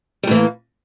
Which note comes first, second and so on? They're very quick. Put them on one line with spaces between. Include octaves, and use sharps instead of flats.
G3 A2 E3 A#3